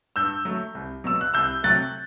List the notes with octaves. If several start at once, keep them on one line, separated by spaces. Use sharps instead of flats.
G2 E6 G6
F#3 A3
C2
B2 F#3 E6
F#6
C2 E6 G6
C3 F#3 A3 F#6 A6